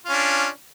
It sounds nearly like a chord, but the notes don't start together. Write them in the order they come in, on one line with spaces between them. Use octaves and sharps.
F4 C#4 D4